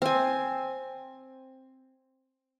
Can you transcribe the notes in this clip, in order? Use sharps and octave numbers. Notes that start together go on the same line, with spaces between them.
C4 G#5